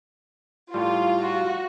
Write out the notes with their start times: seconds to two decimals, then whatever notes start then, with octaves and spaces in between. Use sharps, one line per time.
0.74 A2 G3 F4
1.20 F#4